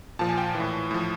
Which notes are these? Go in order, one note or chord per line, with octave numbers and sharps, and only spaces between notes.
A#2 F3 A5
G#5
G5
E3
A2
A2 F3